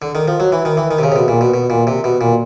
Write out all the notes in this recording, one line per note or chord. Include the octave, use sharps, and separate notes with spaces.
D3
D#3
F3
F#3
E3
D#3
E3
D#3
C3
C#3
C3
B2
A#2
B2
B2
A#2
C3
B2
A#2